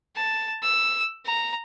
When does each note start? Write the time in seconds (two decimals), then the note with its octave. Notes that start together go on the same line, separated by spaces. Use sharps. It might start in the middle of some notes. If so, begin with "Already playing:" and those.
0.16 A5
0.63 E6
1.26 A#5